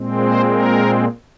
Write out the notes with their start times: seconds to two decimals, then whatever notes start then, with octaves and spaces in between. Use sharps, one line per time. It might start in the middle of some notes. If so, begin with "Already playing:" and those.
Already playing: A#2 G#3 C4
0.21 C5
0.50 A#4